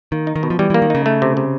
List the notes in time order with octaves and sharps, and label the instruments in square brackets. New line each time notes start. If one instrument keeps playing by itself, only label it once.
[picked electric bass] D#3 [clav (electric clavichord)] A#3
[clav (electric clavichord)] D#4
[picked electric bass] D#3
[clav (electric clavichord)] B2
[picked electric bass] F3
[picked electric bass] E3 [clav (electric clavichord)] G3
[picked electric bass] E3 [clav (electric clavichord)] A#3
[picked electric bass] D#3
[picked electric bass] C#3 [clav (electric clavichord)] D#4
[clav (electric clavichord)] A3
C3
C3